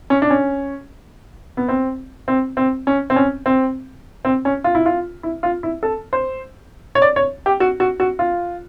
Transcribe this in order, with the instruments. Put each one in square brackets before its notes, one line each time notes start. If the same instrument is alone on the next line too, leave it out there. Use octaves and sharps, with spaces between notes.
[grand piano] C#4
D4
C#4
B3
C4
C4
C4
C#4
C4
C#4
C4
C4
C#4
F4
E4
F4
E4
F4
E4
A4
C5
C#5
D5
C#5
G4
F#4
F#4
F#4
F4